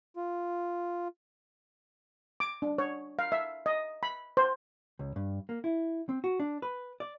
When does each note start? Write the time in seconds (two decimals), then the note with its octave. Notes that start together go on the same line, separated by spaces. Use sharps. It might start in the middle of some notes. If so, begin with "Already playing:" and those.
0.16 F4
2.40 D6
2.62 D4
2.78 C#5
3.19 F5
3.32 E5
3.66 D#5
4.03 B5
4.37 C5
4.99 C#2
5.16 G2
5.49 A#3
5.64 E4
6.09 C4
6.24 F#4
6.40 D4
6.62 B4
7.00 D5